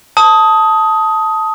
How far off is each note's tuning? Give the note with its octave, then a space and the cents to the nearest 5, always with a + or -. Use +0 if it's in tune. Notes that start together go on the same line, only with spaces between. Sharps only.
A5 +0 D#6 +15